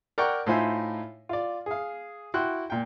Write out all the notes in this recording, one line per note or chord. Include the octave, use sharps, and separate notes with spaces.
A#4 D5 F#5 G5 A#5 C#6
A2 D#4 F4 C5 E5 G#5
F4 D5
G#4 F5
E4 F#4 G5 C6 F#6
A#2 G5